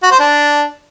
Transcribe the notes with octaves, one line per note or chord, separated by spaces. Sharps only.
F#4
C5
D4